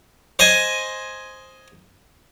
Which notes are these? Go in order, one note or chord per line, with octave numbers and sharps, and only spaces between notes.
C5 D#5 G#5